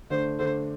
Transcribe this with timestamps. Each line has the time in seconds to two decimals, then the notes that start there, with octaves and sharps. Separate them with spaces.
0.10 D3 A3 D4 C5
0.39 D3 A3 D4 C5